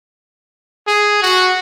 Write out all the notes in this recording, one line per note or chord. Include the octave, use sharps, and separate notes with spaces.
G#4
F#4